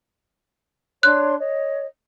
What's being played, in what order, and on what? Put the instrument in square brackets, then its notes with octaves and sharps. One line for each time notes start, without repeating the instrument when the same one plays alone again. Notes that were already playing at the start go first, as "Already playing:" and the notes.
[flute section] D4 C#5 C6 [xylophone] F#6
[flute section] C#5 D#5